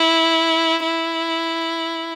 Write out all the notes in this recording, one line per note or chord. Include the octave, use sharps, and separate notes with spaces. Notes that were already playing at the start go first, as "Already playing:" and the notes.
Already playing: E4
E4